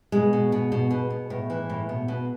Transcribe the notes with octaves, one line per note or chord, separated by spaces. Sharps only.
B2 G#3
B2
B2
B2
B2
B2
A2
E3
A2
B2
B2